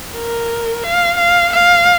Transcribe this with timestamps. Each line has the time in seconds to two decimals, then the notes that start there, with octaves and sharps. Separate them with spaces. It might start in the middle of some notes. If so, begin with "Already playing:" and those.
0.14 A#4
0.84 F5
1.18 F5
1.54 F5